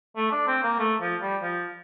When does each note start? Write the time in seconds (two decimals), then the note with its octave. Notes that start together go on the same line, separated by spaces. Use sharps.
0.16 A3
0.32 D4
0.47 C4
0.63 A#3
0.79 A3
1.01 F3
1.22 G3
1.42 F3